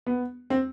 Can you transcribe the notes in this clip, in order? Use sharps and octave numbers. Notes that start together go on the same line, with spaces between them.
B3
C4